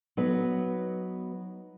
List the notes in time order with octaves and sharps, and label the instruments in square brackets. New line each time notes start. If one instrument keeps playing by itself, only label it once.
[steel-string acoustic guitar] F#3 B3 D#4 B4